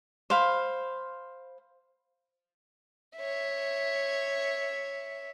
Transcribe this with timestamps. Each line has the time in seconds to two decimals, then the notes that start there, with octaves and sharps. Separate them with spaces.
0.30 C5 F5 B5
3.18 C#5 E5